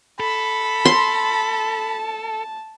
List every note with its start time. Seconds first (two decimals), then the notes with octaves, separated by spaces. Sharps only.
0.20 A4 B5
0.85 A5 C6